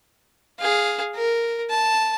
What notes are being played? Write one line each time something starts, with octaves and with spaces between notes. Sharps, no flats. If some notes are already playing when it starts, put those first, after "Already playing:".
G#4 F5
A#4
A5